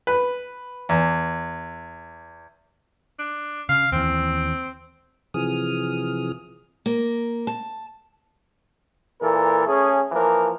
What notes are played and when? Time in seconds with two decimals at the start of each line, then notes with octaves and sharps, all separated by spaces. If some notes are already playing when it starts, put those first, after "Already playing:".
0.07 B4
0.89 E2
3.19 D4
3.69 C#3 F5
3.92 D#2 E3 C4
5.34 C3 E3 F3 G#4 D#6 F6
6.86 A#3
7.47 A5
9.21 A#2 E3 A4 A#4
9.67 A3 C#4 G#4
10.12 E3 F3 A#3 A#4